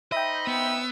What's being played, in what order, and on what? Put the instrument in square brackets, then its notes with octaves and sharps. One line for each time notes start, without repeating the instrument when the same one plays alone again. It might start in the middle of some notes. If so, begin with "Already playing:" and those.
[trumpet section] D#4 C5 B5 [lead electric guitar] D#5 [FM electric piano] E5 G5
[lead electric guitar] B3 [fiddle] E6